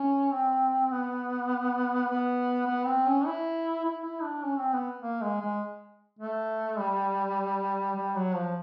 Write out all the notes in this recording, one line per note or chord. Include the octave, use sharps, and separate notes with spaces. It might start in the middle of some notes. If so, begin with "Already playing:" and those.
Already playing: C#4
C4
B3
B3
B3
C4
C#4
E4
E4
E4
D4
C#4
C4
B3
A#3
G#3
G#3
A3
G3
G3
F#3
F3